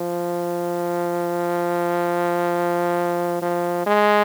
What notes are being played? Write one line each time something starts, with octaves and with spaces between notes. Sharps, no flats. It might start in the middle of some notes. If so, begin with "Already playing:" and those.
Already playing: F3
F3
G#3